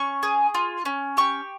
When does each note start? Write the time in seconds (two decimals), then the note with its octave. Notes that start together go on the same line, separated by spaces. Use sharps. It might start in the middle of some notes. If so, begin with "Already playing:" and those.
Already playing: C#4 C#6
0.23 G#4
0.54 F4
0.85 C#4
1.17 G4 C#6